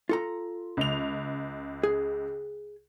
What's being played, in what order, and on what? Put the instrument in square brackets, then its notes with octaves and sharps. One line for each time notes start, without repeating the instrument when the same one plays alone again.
[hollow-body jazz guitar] F4 A4 A#5
[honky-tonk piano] C#2 F7
[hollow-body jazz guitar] G#4